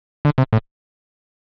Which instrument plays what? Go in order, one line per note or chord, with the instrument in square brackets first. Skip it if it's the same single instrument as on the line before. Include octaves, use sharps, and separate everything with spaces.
[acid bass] D3
C3
A2